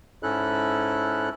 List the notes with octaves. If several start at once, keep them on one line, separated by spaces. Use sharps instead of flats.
G#2 C#4 E4 A4 F#6